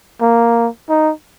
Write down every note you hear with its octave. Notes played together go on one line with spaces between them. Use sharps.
A#3
D#4